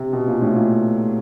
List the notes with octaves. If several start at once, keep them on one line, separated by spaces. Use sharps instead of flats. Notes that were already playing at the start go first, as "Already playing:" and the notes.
Already playing: C3
B2
A#2
A2
A#2